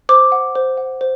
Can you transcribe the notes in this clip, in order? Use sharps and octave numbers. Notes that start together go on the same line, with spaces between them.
C5 D6
F#5
C5
F#5
C5